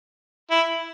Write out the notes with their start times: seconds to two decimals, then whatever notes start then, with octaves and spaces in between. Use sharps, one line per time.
0.51 E4